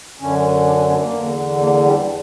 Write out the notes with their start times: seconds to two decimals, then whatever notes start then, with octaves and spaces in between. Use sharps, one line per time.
0.19 F#2 D3 C#4
0.66 D4
0.78 C#4
0.90 B3
1.03 A#3
1.14 E2 D3
1.61 A#3
1.84 G3